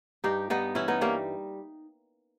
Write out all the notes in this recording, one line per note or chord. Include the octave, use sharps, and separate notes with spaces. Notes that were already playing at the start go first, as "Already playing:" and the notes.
G2 D#4 G4
G2 B3 D#4
E3 C#4 E4
B3 D#4
G3 A#3 C#4